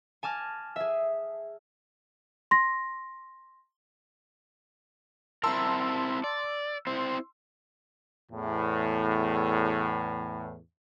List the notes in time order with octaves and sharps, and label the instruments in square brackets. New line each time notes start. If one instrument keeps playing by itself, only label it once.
[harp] G#5 A5 D6 F6 A#6
G#4 E5
[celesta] C6 A#6
[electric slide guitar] C4 E4 A#4 [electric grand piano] A5 C6 E6
[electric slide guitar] D5
[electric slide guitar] C4 E4 C5 [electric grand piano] C6
[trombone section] E2 A2